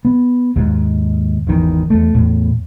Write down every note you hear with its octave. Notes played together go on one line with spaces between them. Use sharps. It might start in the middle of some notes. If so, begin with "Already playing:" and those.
B3
D#2 G#2
G#1 E2 D#3 E3
E2 A3
E2 A2